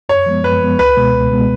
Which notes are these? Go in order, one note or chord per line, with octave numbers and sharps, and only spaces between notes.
F#2 C#5
F3 G#3 B3
F#2 B4
F3 G#3 B3
C#2 B4
B2 G#3 B3
C#2
B2 G#3 B3